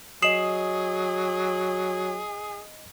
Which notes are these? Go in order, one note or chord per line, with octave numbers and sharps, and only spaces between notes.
F#3 G#4 D#5 D#6 C7 E7 F#7